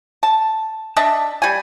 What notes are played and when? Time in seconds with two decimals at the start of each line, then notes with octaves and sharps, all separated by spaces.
0.23 A5
0.97 D4 D#5 E5 A5
1.42 G3 G#5